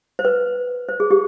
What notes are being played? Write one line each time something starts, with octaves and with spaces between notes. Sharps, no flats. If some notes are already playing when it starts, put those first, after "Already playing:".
C5
B4
C5
G#4
G4